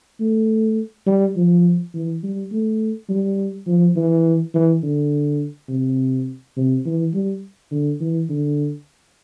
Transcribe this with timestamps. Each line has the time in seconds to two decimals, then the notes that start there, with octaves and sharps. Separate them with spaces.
0.20 A3
1.07 G3
1.37 F3
1.94 E3
2.23 G3
2.52 A3
3.09 G3
3.67 F3
3.96 E3
4.55 E3
4.83 D3
5.69 C3
6.57 C3
6.86 E3
7.14 G3
7.71 D3
8.00 E3
8.29 D3